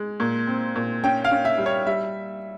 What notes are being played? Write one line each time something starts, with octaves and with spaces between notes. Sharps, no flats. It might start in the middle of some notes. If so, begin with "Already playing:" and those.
Already playing: G#3
A#2
C4
A#2
C#4 G5
F5
C#4
E5
G3
C#5
G3 E5